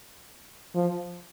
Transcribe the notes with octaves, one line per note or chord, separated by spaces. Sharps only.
F3